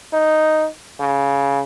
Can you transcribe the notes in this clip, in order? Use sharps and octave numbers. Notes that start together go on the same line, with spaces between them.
D#4
C#3